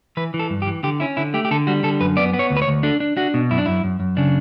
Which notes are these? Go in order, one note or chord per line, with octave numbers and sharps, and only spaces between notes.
E3 B4
E3
A4
G2
G4
E3
D3 G4
C#4 E4
D3 E4
A3 G4
G4
D3 A4
G3 F#4
D3 A4
F#2 B4
B3 D5
B3
C#5
D2
B4
C#5
D2
D4 A4
D4
D4 F#4
B2
F#2 E4
D4
F#2 E4
F#2
F#2
C#3 D4